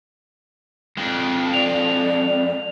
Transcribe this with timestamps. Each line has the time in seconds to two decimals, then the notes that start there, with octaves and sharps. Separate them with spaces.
0.97 F2 G#3 D4
1.54 D5 F7